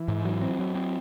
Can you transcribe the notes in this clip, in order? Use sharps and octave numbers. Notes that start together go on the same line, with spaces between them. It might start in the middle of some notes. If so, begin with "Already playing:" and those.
Already playing: E3
G#2
F#3
C4
F#3
C4